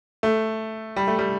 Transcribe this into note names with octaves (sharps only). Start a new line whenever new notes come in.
A3
G3
A3
G3